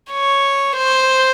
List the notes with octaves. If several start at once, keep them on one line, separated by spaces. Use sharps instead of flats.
C#5
C5